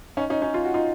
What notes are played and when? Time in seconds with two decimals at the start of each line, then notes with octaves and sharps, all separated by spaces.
0.17 C#4 D#4
0.30 C#4 D#4
0.42 C#4 D#4
0.54 F4
0.65 F#4
0.74 D#4 F4